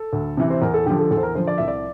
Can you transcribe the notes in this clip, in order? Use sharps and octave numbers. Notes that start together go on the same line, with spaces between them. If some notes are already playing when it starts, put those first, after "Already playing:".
Already playing: A4
D2
C3 E3
C5
E2 A#4
A4
D3 F3 G4
A4
E2 A4
C5
A#4
D3 F3 C5
D5
C2 E5
D5